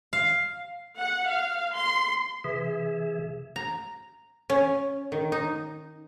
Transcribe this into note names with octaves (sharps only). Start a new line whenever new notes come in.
F5
F#5
F5
C6
C3 E3 G#4 E5
A#5
C#4
D#3
D#4